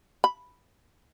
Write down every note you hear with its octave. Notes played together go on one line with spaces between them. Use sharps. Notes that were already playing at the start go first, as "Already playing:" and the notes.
B5